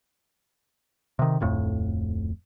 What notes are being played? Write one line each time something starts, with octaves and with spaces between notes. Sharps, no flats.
C3 D#3
D1 F2 A2